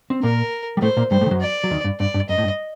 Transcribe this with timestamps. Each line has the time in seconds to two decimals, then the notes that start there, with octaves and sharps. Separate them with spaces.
0.10 C4
0.23 A#2 A#3 A#4
0.77 G3
0.82 A2 A3 C5
0.97 A#2 A#3
1.11 G2 G3 C5
1.21 A2 A3
1.26 D#3
1.31 F#2 F#3
1.41 D5
1.64 F#3
1.71 D#2 D#3
1.84 G2
2.00 G2 D5
2.14 G2
2.29 F#2 D#5
2.38 A2
2.44 G2